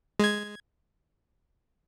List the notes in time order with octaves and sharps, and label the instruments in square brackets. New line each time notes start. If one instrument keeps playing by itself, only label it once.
[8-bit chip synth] G#3 G#6